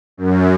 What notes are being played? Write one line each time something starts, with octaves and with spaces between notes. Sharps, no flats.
F#2